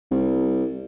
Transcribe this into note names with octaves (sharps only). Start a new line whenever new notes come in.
C2